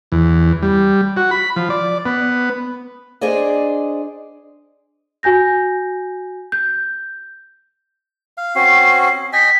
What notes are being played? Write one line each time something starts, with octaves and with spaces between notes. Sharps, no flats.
E2
G3
F#4
B5
F3
D5
B3
D4 G#4 C5 D5 D#5
F#4 G#5 G6 A#6
G6
F5
C4 C#4 F#4 C7
D#5 G5 G#5 B6